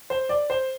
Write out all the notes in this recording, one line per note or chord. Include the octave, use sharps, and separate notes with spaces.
C5
D5
C5